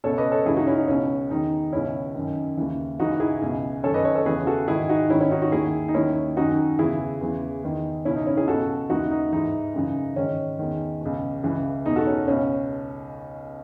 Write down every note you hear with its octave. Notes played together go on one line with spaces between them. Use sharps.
C#2 B2 A4 C#5
B4 D#5
A4 C#5
C#2 C#3 E3 E4 G#4
D#4 F#4
C#4 E4
D#4
C#2 B2 C#4
E2 D#3 D#4
C#2 B2 C#4 E4
F#2 D#3
D#2 C#3 E3
C#2 C#3 E3 D#4 F#4
E4 G#4
C#2 B2
F#2 D#3 A4 C#5
B4 D#5
A4 C#5
A4 C#5
E2 C#3 E3 G#4 B4
F#4 A4
G#2 D#3 E4 G#4
D#4 F#4
G#2 D#3 C#4 E4
C#4 E4
D#4 F#4
D#4 F#4
D#2 D#3 E4 G#4
D#4
D#2 D#3 C#4 E4
F#2 D#3 D#4 F#4
E2 C#3 E3 E4 G#4
E2 C#3 E3
E2 D#3
C#2 B2 C#4 E4
D#4
C#4 E4
E4 G#4
C#2 B2 F#4 A4
D#2 C#3 E3 D#4 F#4
D#4
G#2 E3 D#4
F#2 C#3 E3
G#2 D#3 C#4
E2 D#3
C#2 B2
C#2 C#3 E3
E2 B2 D#4
F#4 A4
C#4
C#2 B2 C#4